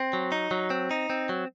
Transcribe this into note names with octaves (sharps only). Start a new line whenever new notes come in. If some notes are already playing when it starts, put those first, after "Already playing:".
Already playing: C4
F#3
D#4
F#3
C4
D#4
C4
F#3